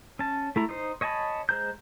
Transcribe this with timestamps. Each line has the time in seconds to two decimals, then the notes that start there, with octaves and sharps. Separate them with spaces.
0.19 C#4 A5
0.56 A3 E4 A#5
0.69 D#4 C5
1.01 C#5 D#5 G#5 A5 B5
1.49 G#3 C5 A#5 G6